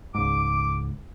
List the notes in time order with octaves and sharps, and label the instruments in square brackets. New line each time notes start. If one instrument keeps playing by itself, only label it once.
[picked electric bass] C#2 G#2 [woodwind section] D6